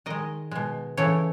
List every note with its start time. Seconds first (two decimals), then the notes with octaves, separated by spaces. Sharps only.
0.06 D#3 G#3 D#5
0.51 B2 G#3
0.97 C#3 E3 A3 C#5